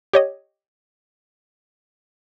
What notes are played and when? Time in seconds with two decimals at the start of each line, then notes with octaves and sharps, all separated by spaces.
0.13 G4 C#5 D#5